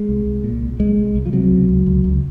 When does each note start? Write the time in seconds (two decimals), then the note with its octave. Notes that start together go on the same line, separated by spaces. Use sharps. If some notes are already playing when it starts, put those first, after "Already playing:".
Already playing: G#3
0.09 C2
0.26 C2
0.44 A#2
0.62 C2
0.79 C2 G#3
0.97 C2
1.15 C2
1.26 F3
1.33 C3 F#3
1.51 C#2
1.69 C#2
1.86 C#2
2.04 C#2